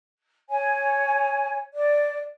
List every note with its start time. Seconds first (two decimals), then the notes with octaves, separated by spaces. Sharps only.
0.49 C#5 G#5
1.73 D5